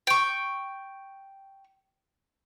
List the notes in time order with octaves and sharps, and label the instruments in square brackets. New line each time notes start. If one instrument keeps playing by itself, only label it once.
[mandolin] G5 C#6